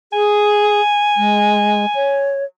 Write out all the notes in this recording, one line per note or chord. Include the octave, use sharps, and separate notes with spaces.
G#4 G#5
G#3
C#5